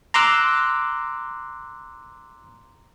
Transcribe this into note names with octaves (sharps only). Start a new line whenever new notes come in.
A#5 C6 D6 E6 F#6